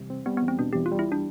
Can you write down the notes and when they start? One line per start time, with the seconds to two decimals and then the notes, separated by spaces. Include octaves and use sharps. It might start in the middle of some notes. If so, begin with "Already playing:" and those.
Already playing: E2 C3 E3 G3
0.10 C4
0.26 G3 B3
0.37 B3
0.42 E2
0.48 C4
0.59 B2 D4
0.73 E2 G4
0.86 F4
0.92 G3
0.99 E4
1.12 D4